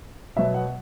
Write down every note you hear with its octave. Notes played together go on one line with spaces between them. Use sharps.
B2 F#3 B3 E5
F#5